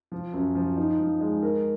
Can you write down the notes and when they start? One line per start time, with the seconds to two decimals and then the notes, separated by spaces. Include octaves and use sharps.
0.12 F3
0.33 F#2
0.55 F3
0.77 D#4
0.99 F3
1.21 G#3
1.42 A#4